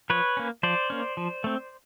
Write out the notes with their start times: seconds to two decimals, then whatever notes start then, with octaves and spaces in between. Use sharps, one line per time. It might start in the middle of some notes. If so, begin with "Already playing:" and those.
0.10 F3 B4 C#5
0.37 A#3 C#4
0.63 F3 C5 D5
0.90 A#3 C#4
1.17 F3
1.44 A3 C4